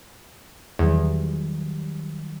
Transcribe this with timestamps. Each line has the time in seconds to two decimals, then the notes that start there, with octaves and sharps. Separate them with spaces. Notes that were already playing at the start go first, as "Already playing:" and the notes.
0.79 E2 D#3 F#3 G3